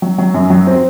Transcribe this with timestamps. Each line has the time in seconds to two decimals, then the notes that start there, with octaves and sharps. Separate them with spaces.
0.02 F#3
0.18 F#3
0.34 F#2
0.50 F#3
0.67 C4